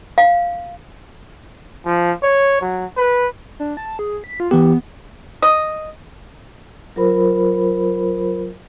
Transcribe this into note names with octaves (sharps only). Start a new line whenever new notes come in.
F5
F3
C#5
F#3
B4
D4
A5
G#4
B6
F4
E3 B3 G4
D#5
F#3 F4 A#4 C5 B5